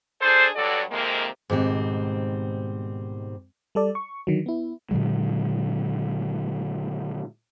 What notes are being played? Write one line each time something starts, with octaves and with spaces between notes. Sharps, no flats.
D4 G#4 A4 C5
G2 F#3 F#4 A4 D5
F2 C3 D#3 G#3 A#3
G#2 B2 D#3 G3 C4
G3 A4 D5
C#6
D3 D#3 F#3
B3 E4
A#2 D3 F#3 G#3